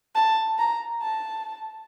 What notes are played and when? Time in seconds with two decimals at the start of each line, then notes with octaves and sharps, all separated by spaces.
0.15 A5
0.58 A#5
1.02 A5